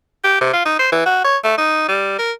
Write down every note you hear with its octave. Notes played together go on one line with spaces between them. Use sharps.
G4
C3
F4
D#4
C5
E3
F#4
C#5
A3
D#4
G3
A#4